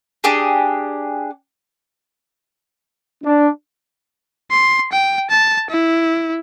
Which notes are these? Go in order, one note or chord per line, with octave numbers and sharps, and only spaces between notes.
D4 G4 G#4
D4
C6
G5
A5
E4